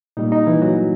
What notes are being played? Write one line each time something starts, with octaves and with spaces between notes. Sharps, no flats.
A#2 G3 A#3 D#4
D#4
E3 E4
F#3 F#4